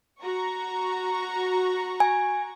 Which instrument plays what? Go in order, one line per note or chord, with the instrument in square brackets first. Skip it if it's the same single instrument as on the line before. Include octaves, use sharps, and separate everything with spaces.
[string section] F#4 A#5 C#6
[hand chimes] G#5